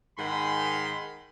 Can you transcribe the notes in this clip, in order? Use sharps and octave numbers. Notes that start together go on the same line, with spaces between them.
G#2 D#3 F#5 G#5 B5 C6